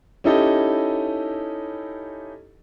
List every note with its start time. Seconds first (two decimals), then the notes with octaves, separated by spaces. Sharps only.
0.24 C#4 D#4 E4 G4 A4 D#5